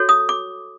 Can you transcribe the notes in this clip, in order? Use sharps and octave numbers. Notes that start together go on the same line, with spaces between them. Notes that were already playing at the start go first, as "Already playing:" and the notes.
Already playing: F#4 A4 C#5
D#6
D6